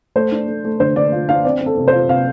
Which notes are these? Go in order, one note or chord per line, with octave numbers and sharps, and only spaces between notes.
A3 C5
D4
A3
A3
D3 C5
D3 D5
F4
D4 F5
C4 D5
C4
A4
C3
C5
F4
C3 F5